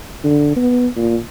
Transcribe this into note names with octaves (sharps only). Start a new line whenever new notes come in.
D3
B3
A#2